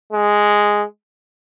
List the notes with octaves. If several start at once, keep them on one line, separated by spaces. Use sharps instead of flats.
G#3